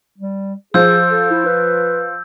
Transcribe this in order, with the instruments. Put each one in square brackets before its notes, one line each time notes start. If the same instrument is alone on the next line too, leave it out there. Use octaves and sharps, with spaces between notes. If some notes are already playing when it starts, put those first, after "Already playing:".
[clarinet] G3
[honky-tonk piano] F3 [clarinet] G#4 [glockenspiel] E6 G6
[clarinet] A4
E4
B4